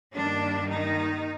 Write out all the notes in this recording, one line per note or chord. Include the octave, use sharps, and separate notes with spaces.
G2 D#3 G3 A#3 D4
D#3 D#4